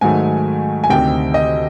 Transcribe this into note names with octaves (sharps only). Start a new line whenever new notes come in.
G#2 D#3 F#3 A3 G#5
G#5
D2 C3 D#3 G5
D#5